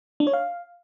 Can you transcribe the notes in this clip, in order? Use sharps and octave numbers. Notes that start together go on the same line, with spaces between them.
D4
C#5
F5